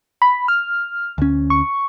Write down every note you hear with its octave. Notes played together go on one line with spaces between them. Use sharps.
B5
F6
D2 C#4
C#6